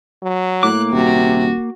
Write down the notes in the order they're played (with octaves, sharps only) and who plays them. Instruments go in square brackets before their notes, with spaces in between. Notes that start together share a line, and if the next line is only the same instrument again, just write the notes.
[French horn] F#3
[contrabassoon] A2 [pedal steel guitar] A#3 D6 [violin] F#6
[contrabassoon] D#1 [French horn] C3 [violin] F#4